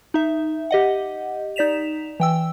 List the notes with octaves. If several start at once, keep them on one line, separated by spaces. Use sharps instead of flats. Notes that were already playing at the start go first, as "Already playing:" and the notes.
D#4 E5
G4 D#5 F#5
D#4 D5 B6 E7 F7
E3 G5 E6